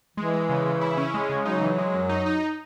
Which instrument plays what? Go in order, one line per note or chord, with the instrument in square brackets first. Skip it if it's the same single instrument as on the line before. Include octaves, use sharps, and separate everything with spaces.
[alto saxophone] E3 [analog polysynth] G#3
[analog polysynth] G#3
C#3
C#3
E4
C#4
G#3
C#3
[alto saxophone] F#3 [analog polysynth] D#4
[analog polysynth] E3
G#3
F#2
D#4
D#4